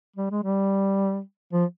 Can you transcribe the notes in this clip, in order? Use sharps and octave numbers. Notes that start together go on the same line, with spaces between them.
G3
G#3
G3
F3